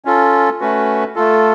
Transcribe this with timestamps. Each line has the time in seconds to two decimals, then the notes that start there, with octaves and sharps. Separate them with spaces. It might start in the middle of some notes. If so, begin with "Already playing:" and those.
0.05 C#4 F4 A4
0.60 A3 C#4 F#4 B4
1.15 A3 F4 A4